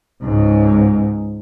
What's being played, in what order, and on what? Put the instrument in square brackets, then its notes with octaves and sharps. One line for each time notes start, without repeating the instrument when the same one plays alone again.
[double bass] C#2 G#2